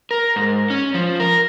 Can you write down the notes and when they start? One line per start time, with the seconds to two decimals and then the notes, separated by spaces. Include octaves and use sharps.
0.11 A#4
0.36 G#2
0.70 C#4
0.94 F3
1.20 A#4